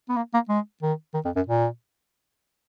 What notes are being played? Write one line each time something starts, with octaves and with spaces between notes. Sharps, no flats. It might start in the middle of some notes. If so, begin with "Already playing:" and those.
B3
A#3
A#3
G#3
D#3
D#3
F2
F#2
A#2